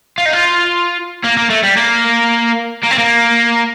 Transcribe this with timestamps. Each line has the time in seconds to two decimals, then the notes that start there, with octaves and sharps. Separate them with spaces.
0.18 F4
0.26 D#4
0.33 F4
1.24 A#3
1.37 A#3
1.50 A3
1.64 G3
1.77 A#3
2.83 A#3
2.91 C4
2.98 A#3